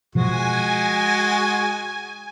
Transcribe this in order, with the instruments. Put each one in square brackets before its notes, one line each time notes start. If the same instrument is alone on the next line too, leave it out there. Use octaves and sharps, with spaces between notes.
[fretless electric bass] B2 F3 [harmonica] G#3 F#4 [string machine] G#5